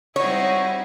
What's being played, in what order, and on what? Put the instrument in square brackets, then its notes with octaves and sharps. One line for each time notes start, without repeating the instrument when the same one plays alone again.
[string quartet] G3 C4 D#4 [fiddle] E4 F#4 [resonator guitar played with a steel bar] C#5